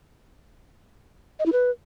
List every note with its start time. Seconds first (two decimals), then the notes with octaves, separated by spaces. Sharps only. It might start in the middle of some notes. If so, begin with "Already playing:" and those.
1.39 D#5
1.46 E4
1.52 B4